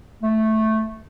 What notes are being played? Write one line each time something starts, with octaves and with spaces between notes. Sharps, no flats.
A3